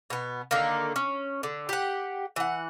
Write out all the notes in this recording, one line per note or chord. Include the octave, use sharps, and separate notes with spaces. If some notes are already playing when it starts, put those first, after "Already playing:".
B2 B3
D3 D#3 A#3
C#4
D3
G4 F#5
E3 F#5